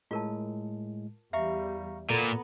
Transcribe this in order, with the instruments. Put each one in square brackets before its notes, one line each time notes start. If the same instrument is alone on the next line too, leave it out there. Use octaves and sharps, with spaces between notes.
[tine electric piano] A2 G#3 [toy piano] F4 A#4 A5
[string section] E2 G3 [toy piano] E5 [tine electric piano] F5 A#5 C#6
[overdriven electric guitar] A#2 [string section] B3 [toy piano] A4 [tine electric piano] A#5